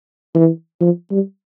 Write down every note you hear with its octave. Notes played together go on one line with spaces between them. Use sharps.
E3
F3
G3